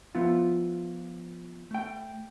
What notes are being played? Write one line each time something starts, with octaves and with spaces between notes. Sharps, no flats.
F3 B3 E4 F4
A3 G5